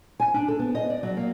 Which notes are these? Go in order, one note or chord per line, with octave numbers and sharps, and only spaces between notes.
G#5
D4
A4
B3
D#5
D5
F#3
A#3